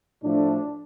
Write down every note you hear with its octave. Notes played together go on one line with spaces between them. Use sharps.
A2 F3 A3 D4